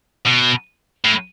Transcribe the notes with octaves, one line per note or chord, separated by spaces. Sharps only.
B2
A2